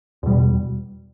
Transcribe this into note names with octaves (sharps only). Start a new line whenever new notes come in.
E2 B2 G3